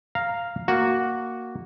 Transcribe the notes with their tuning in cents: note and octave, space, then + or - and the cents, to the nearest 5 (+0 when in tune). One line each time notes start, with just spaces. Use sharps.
F5 +0 A#5 +0
A#3 +0 F#4 +0